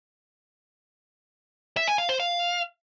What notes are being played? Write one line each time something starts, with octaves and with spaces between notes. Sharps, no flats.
E5
G#5
F5
C5
F5